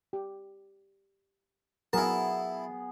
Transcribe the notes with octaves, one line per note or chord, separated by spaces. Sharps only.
G4
F#3 B3 E4 G#4 A#4 A5